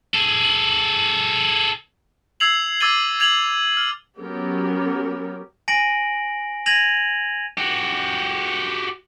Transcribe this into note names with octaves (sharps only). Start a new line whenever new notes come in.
G#4 A4
E6 G#6 C7 F7 F#7
D6 E6 G#6 A6 D#7 G7
G#6 F7 F#7
F6
F#3 B3 C#4 G4 A#4
G#5 A#6 D7 F#7
G#6 A#6 D#7 F7 F#7
F#4 G4